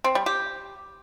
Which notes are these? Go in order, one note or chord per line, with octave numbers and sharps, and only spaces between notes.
C4
G3
G4